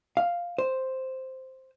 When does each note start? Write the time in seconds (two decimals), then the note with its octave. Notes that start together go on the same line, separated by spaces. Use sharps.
0.17 F5
0.58 C5